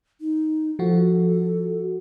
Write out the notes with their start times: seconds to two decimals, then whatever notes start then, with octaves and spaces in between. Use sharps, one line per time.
0.21 D#4
0.79 F3 F#4 A4